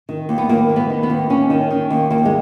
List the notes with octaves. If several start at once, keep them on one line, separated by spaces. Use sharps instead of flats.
D#3
D#2
B3
D#2 A#3
D#3
B3
D#3
B3
D#2
D#2 C#4
D#3
D#3
D#2
D#2 A#3
G#3